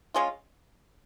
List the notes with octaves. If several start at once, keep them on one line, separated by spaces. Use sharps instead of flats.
G#3 C#4 F4